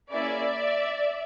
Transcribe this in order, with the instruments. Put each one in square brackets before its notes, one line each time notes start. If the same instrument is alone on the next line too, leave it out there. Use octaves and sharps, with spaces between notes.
[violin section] A#3 C#4 E4 G#4 D5 E5